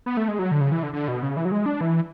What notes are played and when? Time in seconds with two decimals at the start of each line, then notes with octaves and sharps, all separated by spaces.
0.06 B3
0.17 A3
0.28 G#3
0.39 F#3
0.51 D3
0.61 C#3
0.72 E3
0.83 D3
0.93 D3
1.08 B2
1.23 C#3
1.37 E3
1.45 F#3
1.52 G#3
1.66 D4
1.81 E3